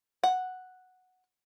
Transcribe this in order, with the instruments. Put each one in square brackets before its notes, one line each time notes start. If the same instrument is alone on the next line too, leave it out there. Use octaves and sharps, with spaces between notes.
[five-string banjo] F#5